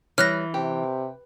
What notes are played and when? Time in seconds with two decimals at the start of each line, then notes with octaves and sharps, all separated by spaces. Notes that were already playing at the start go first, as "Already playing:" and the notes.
0.18 E3 G3 C#5 F6 F#6 A#6
0.54 C3 G4